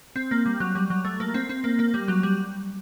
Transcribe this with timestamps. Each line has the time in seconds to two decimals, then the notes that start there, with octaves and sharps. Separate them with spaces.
0.16 C4
0.31 A#3
0.46 G3
0.60 F#3
0.75 G3
0.90 F#3
1.05 A3
1.20 A#3
1.34 C4
1.49 C4
1.64 A#3
1.79 A#3
1.94 G3
2.08 F#3
2.23 G3